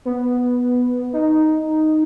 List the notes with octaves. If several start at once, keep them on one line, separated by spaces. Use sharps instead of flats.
B3
D#4